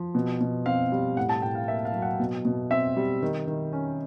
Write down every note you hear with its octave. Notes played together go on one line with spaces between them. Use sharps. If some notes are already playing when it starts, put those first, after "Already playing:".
Already playing: F3
B2
B2
C4 F5
G3
A2 F#5
A5
A2 G5
F5
A#3 E5
F5
F#3
F#5
B2
B2
C4 E5
G3
D#3
D#3
C#4